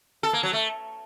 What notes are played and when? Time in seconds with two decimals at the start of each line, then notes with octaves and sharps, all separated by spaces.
0.23 A4
0.33 A#3
0.43 F#3
0.53 A3